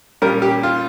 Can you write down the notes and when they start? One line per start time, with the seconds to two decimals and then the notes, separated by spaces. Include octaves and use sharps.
0.22 A#2 G3 C#4 A#4
0.42 G4
0.63 F4